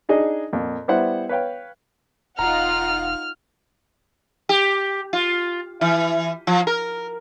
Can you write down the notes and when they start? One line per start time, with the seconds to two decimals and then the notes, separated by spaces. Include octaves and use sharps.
0.09 D4 D#4 G#4 D5 D#5
0.53 F2 A#2
0.88 G3 B3 E4 C5 F#5
1.29 B4 C#5 F5 G5
2.39 E1 D#4 F4 F#5 A#5 F6
4.49 G4
5.13 F4
5.81 E3
6.47 F3
6.67 A#4